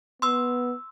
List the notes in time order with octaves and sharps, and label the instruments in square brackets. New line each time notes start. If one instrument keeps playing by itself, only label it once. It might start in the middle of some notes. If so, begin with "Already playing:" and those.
[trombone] B3 [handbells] C6 E6